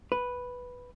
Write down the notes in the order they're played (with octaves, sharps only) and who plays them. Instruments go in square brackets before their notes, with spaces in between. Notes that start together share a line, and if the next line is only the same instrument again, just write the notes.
[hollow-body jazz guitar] B4